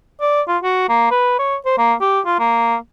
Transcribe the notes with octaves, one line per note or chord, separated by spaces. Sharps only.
D5
F4
F#4
A#3
B4
C#5
C5
A#3
G4
F4
A#3